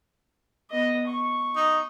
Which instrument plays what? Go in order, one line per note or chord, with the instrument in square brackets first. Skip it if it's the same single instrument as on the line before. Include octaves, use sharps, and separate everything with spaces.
[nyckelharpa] B3 D#5
C#6
[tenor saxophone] D#4